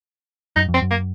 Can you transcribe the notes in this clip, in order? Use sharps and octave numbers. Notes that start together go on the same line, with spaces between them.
F#2 D#4
F2
C4
F#2
A#3